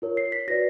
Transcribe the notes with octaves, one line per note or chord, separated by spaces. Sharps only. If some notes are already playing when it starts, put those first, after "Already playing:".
F4 A#4 C#5
C7
B6
F#4 B4 D5 A#6